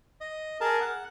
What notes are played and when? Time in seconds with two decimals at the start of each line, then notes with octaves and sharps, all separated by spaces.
0.21 D#5
0.61 G#4 A#4 A5
0.81 F#5